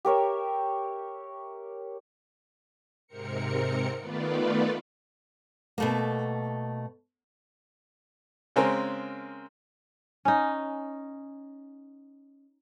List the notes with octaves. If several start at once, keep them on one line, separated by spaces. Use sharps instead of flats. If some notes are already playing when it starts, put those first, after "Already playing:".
G4 A#4 C#5 E5
G#2 C3 C4 A#4 C#7
D#3 A3 B3 F4 B4 D5
B2 A3 A#3
C#3 G#3 C4 C#4 A#4
C#4 D#4